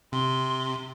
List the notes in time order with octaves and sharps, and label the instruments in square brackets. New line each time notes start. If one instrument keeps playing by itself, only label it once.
[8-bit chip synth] C3 [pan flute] C6